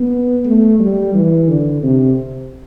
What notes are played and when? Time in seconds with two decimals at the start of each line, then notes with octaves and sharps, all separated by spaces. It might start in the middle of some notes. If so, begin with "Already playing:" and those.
Already playing: B3
0.45 A3
0.79 G3
1.14 E3
1.48 D3
1.83 C3